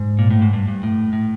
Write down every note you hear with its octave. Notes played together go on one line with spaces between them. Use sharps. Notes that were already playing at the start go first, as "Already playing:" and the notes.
Already playing: G#2
A#2
A2
G#2
G2
G2
A2
A2